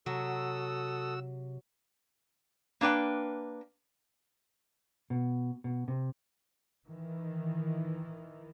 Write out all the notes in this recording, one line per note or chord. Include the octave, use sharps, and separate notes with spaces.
C3 F#3 F#4 A4 D#6 E6
A#3 D4 B4 G5
B2
B2
C3
D#3 E3